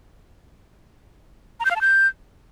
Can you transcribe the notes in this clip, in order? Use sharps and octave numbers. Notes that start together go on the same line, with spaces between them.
A#5
G6
F5
A5
G6